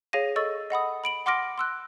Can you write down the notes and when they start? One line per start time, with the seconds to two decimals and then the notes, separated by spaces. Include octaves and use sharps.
0.13 G#4 C#5 F5 A#6 D#7
0.36 A4 D#5 C#6 E6 A6
0.70 D#5 F#5 B5 D#6
1.04 B5 D7 F#7
1.26 F#5 C6 D6 F6 A#6 D7
1.58 C6 E6 F#6